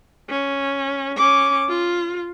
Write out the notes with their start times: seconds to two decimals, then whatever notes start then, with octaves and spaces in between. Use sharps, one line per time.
0.30 C#4
1.17 C#4 D6
1.69 F4